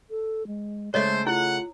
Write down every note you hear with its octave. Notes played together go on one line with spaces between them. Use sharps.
A4
G#3
C#3 G#3 A3 C5 C#5 D#5
E4 F4 F#5